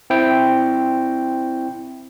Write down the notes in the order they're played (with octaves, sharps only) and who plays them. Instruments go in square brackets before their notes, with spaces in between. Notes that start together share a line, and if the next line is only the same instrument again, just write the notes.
[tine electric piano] C4 E4 G5